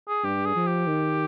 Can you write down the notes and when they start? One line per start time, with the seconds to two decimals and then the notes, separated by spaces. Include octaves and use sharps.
0.08 G#4
0.24 G2 G4
0.45 G#4
0.56 F3
0.67 G4
0.87 D#3